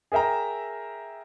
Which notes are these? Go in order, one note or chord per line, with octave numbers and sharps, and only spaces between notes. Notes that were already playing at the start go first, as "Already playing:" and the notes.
G#4 A#4 E5 G5 A#5